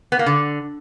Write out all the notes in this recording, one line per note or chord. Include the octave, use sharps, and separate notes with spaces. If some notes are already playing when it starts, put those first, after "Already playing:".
B3
A#3
D3